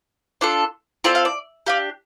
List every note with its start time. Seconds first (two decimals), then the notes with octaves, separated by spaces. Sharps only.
0.41 D4 F4 A4
1.04 C4 F4 A4 D5
1.15 F5
1.25 D5
1.66 D4 G4 F5